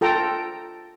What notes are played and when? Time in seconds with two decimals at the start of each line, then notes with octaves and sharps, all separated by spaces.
0.01 F4 A4 G5 A#5